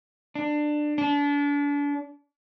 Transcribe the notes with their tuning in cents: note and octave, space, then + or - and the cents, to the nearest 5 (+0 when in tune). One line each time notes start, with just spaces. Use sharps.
D4 +20
D4 -35